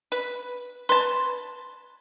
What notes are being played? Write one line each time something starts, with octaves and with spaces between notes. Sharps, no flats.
B4
B4 A5 C6